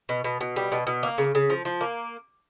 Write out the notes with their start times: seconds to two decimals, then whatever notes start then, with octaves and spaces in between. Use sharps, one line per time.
0.09 B2
0.24 B2
0.41 B2
0.56 G3
0.72 B2
0.87 B2
1.03 A#3
1.18 C#3
1.35 C#3
1.50 F3
1.65 F3
1.81 A#3